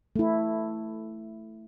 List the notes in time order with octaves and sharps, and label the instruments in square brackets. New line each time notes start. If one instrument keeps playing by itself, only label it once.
[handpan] A3 E4